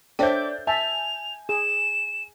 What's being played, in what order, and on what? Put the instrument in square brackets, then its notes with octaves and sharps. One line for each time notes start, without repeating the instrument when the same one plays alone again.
[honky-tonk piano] D4 G6 [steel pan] A4 E5 [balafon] C5 C#5 G5 [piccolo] D6
[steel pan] E5 A5 [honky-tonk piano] G#5 [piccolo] F7
[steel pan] G#4 [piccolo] E7